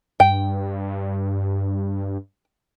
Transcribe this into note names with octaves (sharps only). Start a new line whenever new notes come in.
G2 G5